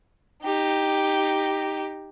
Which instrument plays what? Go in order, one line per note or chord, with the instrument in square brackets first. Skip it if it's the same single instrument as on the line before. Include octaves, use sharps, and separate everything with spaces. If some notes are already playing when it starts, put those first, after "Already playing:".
[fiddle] D#4 G4